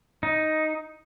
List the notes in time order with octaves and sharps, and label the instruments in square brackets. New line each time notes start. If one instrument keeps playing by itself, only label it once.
[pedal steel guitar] D#4